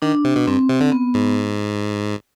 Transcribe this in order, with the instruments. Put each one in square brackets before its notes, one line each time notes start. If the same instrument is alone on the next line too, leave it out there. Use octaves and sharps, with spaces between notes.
[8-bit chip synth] D#3 [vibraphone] D4
[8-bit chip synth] C3
B2
[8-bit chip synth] G2 [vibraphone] C4
[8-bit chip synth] C3
D3
[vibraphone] B3
[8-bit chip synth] G#2